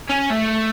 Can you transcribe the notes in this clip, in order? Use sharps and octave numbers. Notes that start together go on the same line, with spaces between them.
C#4
A3